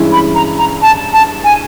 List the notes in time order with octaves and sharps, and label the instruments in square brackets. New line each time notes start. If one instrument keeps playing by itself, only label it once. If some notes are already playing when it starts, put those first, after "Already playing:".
Already playing: [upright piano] G2 E3 G#3 C#4 E4
[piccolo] B5
A#5
A#5
A5
A5
G#5